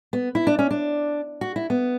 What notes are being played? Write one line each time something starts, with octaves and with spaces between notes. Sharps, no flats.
B3
E4
D4
C#4
D4
F#4
E4
B3